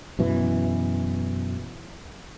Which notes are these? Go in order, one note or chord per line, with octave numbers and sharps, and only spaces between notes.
F#2 B2 E3